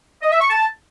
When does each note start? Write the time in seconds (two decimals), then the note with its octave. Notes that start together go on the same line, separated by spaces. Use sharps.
0.22 D#5
0.32 E5
0.41 C#6
0.50 A5